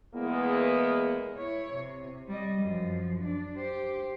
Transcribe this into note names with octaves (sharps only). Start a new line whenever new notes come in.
E2 E3 G#3 A#3 B3
E4 C#5
C3
G3 D#5
F#2 F3
D4
G4 C5